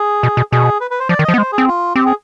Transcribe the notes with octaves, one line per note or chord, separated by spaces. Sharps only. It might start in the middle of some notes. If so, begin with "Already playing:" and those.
Already playing: G#4
B2
B2
B2 G#4
B4
B4
C5
F3 D5
D#3
F3 D#5
B3
G#3 C5
G#4
C4
F4
C4 G4
G#4